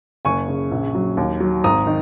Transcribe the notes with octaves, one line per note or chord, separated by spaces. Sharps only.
F#1 G#5 C#6
C#3
A#1
F#3
D#2
F#3
G#1 A#5 D#6
D#3